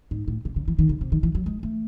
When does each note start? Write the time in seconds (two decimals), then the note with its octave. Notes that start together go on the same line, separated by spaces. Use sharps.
0.11 G#2
0.28 A2
0.45 C3
0.56 C#3
0.68 E3
0.79 D#3
0.89 C#3
1.01 C3
1.12 D#3
1.23 E3
1.35 F#3
1.46 G#3
1.63 A3